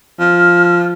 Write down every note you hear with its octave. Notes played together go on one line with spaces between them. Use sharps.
F3 F6